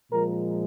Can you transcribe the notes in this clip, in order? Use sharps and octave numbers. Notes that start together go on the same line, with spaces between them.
A#2 F3 G#3 A#4